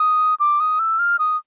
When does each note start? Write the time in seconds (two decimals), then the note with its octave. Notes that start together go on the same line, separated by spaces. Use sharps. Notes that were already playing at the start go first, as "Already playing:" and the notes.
Already playing: D#6
0.40 D6
0.60 D#6
0.79 E6
0.99 F6
1.19 D#6